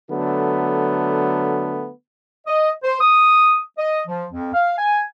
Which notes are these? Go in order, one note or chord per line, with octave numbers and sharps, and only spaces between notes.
D3 F#3 A3 B3
D#5
C5
D#6
D#5
F3
F2
F5
G#5